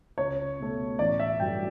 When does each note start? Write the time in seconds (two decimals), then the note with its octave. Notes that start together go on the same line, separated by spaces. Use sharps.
0.18 C#2 C#5
0.60 B2 A3
0.99 A1 D5
1.19 E5
1.40 G2 F#3 A3 G5